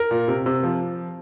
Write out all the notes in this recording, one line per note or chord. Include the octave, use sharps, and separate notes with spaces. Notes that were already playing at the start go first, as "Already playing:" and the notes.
Already playing: A#4
A#2
C3
C3
F3